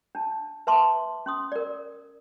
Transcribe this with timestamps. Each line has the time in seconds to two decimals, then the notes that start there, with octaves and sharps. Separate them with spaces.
0.15 D4 A5
0.67 B4 E5 A5 C6 D6
1.26 C#4 C6 D#6
1.52 A#4 D5